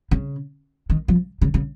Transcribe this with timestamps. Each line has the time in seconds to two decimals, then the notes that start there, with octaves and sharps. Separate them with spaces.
0.11 C#3
0.90 D#3
1.08 F3
1.41 C#3
1.54 C#3